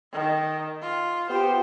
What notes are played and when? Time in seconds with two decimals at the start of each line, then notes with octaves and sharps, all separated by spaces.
0.13 D#3
0.82 F4
1.30 B3 F4 G4 C5